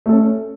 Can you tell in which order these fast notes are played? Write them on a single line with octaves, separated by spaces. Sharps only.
A3 A4 C#4